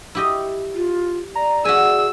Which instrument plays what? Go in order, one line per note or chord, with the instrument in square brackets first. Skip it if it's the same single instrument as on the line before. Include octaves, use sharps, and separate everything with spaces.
[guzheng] E4 G4 D#5
[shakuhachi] F4
[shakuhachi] D5 [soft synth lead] A#5
[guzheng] F#4 E5 G#5 [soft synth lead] G#4 [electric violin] E6